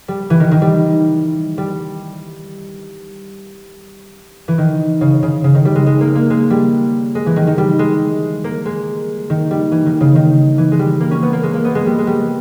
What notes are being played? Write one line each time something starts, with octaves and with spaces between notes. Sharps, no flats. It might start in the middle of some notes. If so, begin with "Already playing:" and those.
G3
E3
D#3
D#3
G3
G3
E3
D#3
C#3
C#3
C#3
D#3
G3
G#3
G#3
A#3
A#3
G#3
G3
G#3
E3
D#3
D#3
G3
G#3
A#3
G#3
D#3
G3
E3
D#3
C#3
D#3
E3
G#3
G3
A#3
C#4
B3
A#3
G#3
A#3
B3
G#3
G3
G#3
G3